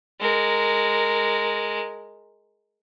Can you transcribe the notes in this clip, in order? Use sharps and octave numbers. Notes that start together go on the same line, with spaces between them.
G#3 A#4